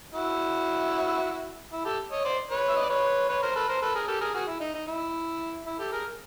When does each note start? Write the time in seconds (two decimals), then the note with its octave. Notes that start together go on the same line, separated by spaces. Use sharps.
0.14 E4 F#4
1.72 E4
1.85 G4 A4
2.12 C#5 D#5
2.25 C5 D5
2.51 B4 C#5
2.69 E5
2.76 D#5
2.82 D5
2.89 B4 C#5
3.29 B4 C#5
3.43 A#4 C5
3.56 A4 B4
3.68 A#4 C5
3.82 A4 B4
3.95 G#4 A#4
4.08 G4 A4
4.21 G#4 A#4
4.34 F#4 G#4
4.47 E4
4.60 D#4
4.74 D#4
4.87 E4
5.66 E4
5.79 G4 A4
5.92 G#4 A#4